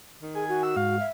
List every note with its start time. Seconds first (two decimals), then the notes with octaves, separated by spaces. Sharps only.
0.22 D#3
0.35 G#4 G#5
0.49 F#4
0.63 E6
0.76 G#2 F5
1.00 E5